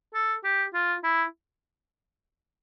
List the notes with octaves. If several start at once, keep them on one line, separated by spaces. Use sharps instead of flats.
A4
G4
F4
E4